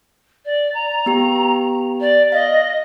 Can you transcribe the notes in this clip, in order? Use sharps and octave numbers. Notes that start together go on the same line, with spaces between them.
D5
A#5
B3 G4 G5
D5
D#5 F5